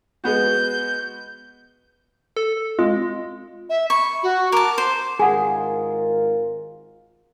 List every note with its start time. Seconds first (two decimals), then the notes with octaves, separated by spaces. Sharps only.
0.24 G#3 B3 F#4 G6
2.37 A4
2.79 G#3 C4 F4
3.69 E5
3.90 B5 C#6
4.23 F#4
4.52 A#4 A5 D6
4.78 C5
5.19 G#1 F4 G#4 A#4 F#5 G#5